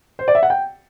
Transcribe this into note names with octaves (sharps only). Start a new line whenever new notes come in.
C5
D5
E5
F#5
G5